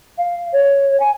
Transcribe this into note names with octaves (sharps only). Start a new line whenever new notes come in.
F5
C#5
G#5